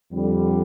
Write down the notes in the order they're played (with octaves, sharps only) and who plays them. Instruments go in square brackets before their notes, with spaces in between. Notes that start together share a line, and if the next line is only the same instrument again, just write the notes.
[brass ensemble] F2 D3 G3